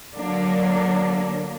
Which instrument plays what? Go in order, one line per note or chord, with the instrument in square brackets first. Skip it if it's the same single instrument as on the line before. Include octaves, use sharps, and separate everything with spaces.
[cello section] D3 F#3 A#3 D4